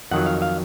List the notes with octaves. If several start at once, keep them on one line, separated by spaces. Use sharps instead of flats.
F2 D#3 F#3 F#5
F5
F5